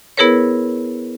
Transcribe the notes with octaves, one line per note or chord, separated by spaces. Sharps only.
B3 E4 G#4 A#4 B4 C#5